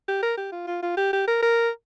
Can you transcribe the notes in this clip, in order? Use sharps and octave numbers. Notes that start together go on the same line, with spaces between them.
G4
A#4
G4
F4
F4
F4
G4
G4
A#4
A#4